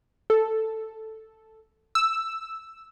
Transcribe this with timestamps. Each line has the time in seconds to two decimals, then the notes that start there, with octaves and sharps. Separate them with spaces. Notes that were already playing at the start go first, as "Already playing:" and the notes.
0.30 A4
1.95 E6